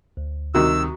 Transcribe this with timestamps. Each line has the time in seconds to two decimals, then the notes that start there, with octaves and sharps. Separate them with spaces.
0.17 D2
0.54 C3 D#3 G3 F#4 E6